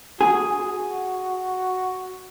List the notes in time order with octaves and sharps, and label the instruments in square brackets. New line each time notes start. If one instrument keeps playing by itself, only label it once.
[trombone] F#4 [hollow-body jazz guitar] G#4